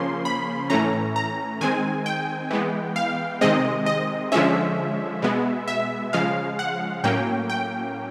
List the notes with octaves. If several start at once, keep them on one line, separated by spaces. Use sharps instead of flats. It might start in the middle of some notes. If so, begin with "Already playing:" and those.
Already playing: C#3 F3 A#3 C#4 C6
B5
A2 E3 A3 C#4 A#5
A#5
D#3 G#3 C4 G#5
G5
E3 G#3 B3
F5
C3 D#3 G#3 C4 D#5
D#5
D3 F3 G#3 C#4 E5
B2 G#3 B3
E5
C#3 F3 G#3 F5
F#5
A2 F#3 A#3 C#4 G5
G5